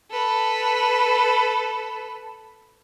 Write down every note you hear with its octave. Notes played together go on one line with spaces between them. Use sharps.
A4 B4